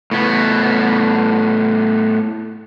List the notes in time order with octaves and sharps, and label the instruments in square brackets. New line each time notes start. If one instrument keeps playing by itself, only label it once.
[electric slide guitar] A2 B3